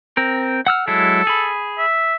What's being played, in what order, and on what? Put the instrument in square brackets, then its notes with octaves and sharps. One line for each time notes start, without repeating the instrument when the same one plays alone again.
[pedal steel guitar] C4 A#4
F#5 E6 F6
[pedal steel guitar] F#3 G#3 E4 [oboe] A4
[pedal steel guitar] G#4 B5
[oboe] E5